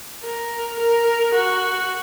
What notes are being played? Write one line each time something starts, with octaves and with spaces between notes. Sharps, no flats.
A#4
A#4
F#4